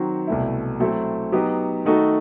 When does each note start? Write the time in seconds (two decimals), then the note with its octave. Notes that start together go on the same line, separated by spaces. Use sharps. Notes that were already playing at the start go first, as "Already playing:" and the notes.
Already playing: D#3 F#3 C4 F#4
0.27 C2 B2 A3 E4
0.80 F#3 A3 C4 E4 A4
1.32 F#3 B3 D#4 G4
1.85 D#3 A3 D#4 F#4 A4